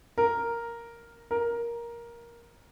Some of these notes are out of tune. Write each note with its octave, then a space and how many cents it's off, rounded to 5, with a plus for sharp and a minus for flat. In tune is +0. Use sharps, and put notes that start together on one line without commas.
A#4 +0
A#4 +10